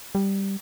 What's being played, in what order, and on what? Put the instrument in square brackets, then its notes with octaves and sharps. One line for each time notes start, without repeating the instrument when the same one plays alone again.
[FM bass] G3